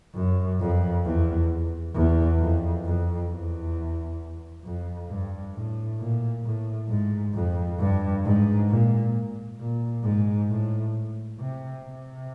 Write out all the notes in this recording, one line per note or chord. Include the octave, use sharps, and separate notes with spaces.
F#2
F2
E2
E2
F2
F2
E2
F2
G2
A2
A#2
A2
G#2
F2
G2
G#2
A#2
A#2
G#2
A2
C3
C3